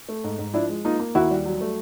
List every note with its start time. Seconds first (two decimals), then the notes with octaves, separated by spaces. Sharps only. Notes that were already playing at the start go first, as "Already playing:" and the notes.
0.09 A3
0.24 G#2
0.39 G#2
0.54 F3 D4 E4
0.69 G#3
0.85 A#3 D#4 F4
0.99 A#3
1.15 D#2 E4 F#4
1.31 G3
1.45 F#3
1.61 A3